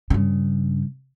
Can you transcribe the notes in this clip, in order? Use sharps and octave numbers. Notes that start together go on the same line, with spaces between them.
G2 C#3